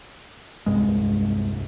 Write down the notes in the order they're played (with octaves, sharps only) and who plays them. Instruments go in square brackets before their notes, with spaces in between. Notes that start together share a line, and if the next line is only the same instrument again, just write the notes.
[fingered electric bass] D#1 C2 [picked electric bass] G2 G#3